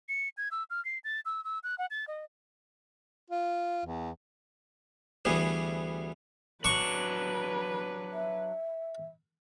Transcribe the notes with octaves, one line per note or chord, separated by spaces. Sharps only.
C#7
G#6
E6
F6
C7
A6
E6
E6
F#6
F#5
A6
D#5
F4
E2
D2 E3 G3 B3 G#4
F#3 D4 B4 C#6
E5